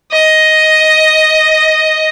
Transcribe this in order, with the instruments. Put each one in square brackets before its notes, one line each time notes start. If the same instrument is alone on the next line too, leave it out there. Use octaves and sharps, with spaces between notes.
[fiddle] D#5